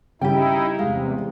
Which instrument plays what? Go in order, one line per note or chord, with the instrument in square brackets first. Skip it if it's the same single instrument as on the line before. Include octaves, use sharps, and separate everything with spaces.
[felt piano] C#3 [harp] G3 [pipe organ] D#4 E4 [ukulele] G4 G5
[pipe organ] E2 C3 [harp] G#3 [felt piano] F5